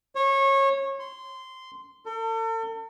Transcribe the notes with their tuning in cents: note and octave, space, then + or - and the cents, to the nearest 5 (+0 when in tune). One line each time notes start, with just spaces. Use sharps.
C#5 -25
C6 -15
A4 +40